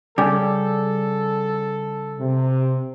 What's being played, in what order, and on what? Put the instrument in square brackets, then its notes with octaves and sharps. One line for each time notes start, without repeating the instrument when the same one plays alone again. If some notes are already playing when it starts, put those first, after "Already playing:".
[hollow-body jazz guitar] C#3 G3 [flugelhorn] A4 [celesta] D5 G#5 D6
[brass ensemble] C3